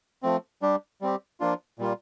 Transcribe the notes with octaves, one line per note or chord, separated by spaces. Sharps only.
F3 A3 C4
G3 D4 G4
G3 C4 G4
F3 A#3 D4 F4
A#2 G3 A#3 F4